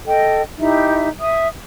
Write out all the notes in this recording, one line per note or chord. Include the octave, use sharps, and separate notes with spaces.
A4 D#5 G5
D#4 E4 G4 E5
E5 D#6